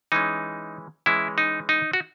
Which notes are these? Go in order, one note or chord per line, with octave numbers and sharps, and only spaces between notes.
E3 G#3 C#4 D#4
E3 G#3 C#4 E4
D#4
D#4
F#4